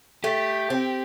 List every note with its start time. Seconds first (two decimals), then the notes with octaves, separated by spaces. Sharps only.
0.24 A3 G4
0.70 C4